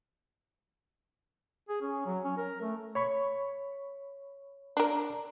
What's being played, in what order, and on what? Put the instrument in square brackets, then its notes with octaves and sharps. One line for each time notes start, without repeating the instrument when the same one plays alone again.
[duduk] G#4
C#4
F#3
C#4
A#4
A3
[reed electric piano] C#5 B5 C#6
[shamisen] D4 A#4